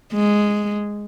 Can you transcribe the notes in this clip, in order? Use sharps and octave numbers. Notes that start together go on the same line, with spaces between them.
G#3